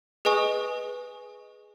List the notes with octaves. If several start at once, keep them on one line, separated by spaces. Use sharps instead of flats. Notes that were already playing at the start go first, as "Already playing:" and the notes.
G#4 B4 D#5 G#5 C#6 D#6